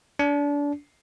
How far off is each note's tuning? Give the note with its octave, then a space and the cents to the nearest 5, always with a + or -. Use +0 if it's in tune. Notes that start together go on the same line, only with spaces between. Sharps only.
D4 -30